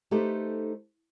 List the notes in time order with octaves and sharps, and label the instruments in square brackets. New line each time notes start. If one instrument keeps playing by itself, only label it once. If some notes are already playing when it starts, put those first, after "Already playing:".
[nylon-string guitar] A3 D#4 G4 A4 B4 C5